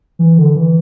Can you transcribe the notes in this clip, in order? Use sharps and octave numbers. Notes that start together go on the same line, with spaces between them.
E3
D3
E3